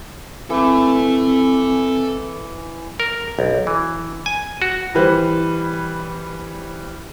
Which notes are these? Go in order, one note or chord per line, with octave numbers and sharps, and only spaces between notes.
E3 C4 A4 E5
A#4
B1
E3
G#5
F#4
E3 G3 B4 C5